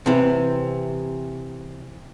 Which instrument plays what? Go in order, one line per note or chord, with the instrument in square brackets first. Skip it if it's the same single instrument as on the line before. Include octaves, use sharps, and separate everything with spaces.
[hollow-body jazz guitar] C3 E3